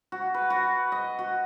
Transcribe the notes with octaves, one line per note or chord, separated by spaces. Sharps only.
F#4
B4
F#4
D#5
F#4